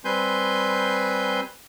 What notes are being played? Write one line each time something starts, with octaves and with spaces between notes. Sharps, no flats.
G3 C4 B4 G#5 C6 G6